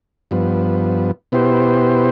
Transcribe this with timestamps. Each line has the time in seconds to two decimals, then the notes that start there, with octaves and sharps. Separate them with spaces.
0.31 G2 F3 B3
1.32 B2 B3 E4 G4 C5